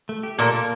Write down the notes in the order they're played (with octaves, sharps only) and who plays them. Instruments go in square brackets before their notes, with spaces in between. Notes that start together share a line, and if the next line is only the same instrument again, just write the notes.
[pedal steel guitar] A3
G4
[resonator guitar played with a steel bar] A#2 A#3 [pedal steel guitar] A4
[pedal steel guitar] A#3